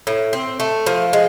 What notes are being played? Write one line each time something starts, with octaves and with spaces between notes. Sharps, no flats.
A2
C4
A3
F3
G#3